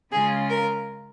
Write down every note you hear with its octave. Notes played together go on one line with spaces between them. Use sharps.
C#3 G#3 C#4 F4 G#4
A#4